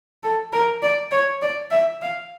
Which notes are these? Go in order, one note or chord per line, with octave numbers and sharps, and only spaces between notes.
A4
A#4
D5
C#5
D5
E5
F5